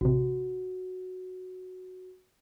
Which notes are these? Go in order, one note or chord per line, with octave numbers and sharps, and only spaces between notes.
A1 C3 F#4